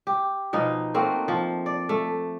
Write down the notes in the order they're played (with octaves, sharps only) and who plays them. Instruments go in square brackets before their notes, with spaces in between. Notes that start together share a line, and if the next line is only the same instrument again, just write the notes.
[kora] G4
B2 F3 D#4
A3 A#3 C4 F#4
F3
D5
A3